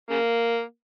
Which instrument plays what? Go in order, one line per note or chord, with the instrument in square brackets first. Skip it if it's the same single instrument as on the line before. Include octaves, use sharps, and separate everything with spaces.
[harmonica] C#3 A#3